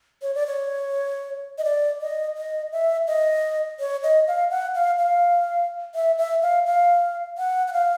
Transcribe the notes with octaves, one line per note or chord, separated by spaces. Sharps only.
C#5
D5
C#5
D#5
D5
D#5
D#5
E5
D#5
C#5
D#5
F5
F#5
F5
F5
E5
E5
F5
F5
F#5
F#5
F5